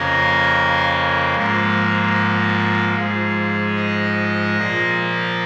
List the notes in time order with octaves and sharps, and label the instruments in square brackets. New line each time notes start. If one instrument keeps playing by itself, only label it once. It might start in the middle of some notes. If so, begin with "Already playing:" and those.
Already playing: [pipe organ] F2 C#3 A#3 A#4
G#2 F3 A#3
G#2 F3 G#3
D#5
A#2 F3 A#3